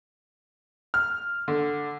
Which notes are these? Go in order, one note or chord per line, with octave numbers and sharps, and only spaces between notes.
F6
D3